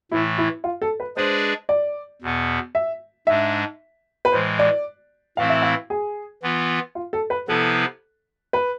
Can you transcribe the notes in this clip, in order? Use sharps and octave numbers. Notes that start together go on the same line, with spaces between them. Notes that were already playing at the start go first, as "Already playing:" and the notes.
A2 E3 A3 E4
E4
F4
A4
B4
G#3 D4 G#4 B4 C5 D5
D5
E2 B2 B3
E5
G#2 G#3 D4 E5
B4
A2 E3 G#3 C5
D5
A2 E3 A3 C4 E4 F5
E5
F5
G#4
E3 B3 F4
F4
A4
B4
C3 F3 B3 E4 A4 B4
B4